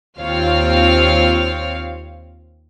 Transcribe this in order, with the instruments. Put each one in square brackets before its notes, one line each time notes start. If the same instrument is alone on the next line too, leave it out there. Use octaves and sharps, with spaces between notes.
[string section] D#2 C4 F4 C#5 F5 F6